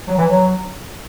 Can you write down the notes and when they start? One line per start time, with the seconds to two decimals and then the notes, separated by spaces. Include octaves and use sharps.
0.08 F#3
0.18 E3
0.29 F#3